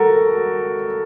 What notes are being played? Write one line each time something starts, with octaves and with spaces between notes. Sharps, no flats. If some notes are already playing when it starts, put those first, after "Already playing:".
Already playing: F#4 A4 A#4